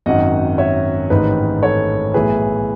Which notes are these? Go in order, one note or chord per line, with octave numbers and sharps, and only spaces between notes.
G#1 F#2 D#3 D#5 F#5
C#5 E5
A1 G#2 D#3 B4 D#5
A4 C#5
B1 A2 E3 G#4 B4